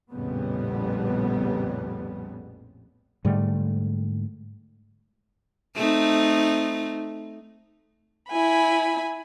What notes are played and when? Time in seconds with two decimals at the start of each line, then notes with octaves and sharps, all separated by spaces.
0.11 A#1 F2 A2 C#3 G3 B3
3.25 G#2 D3 G3 A3
5.75 A3 C4 D#4
8.30 E4 G#5 B5